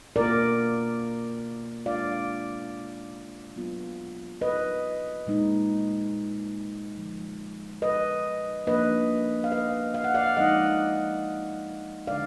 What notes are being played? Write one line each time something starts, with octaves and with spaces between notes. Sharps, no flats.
B2 A#3 F4 A#4 D5
B2 G#3 D4 F4 D5 F5
F#3 B3 F4
B4 D#5
A#2 G#3 D#4
D3 F3 G#3
B4 D#5
F3 A#3 D4 B4 D#5
F5
B4 D#5
F5
F#5
D5 F5
F3 G#3 D#4 D#5 F#5
D3 G#3 D4 D5 F5